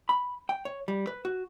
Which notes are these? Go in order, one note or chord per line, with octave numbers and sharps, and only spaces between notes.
B5
G5
C#5
G3
B4
F#4